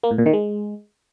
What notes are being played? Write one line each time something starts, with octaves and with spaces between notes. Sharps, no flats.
A#3
A2
A#2
D#3
G#3